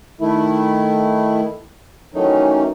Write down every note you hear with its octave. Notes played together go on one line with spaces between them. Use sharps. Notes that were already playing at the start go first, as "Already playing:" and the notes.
D#3 A3 E4
D#3 E3 F#3 A3 C#4 D#4